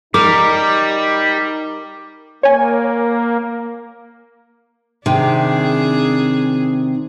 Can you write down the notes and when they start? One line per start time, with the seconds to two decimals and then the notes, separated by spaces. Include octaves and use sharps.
0.14 G3 D#4 A#4 D6
2.43 A#3 C#5 G#5
5.06 C3 D#3 D4 G#4